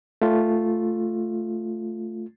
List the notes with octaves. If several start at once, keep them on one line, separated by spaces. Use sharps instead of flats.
A3 F4